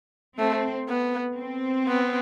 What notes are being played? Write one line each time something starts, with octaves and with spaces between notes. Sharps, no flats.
A3 C4
B3
C4
B3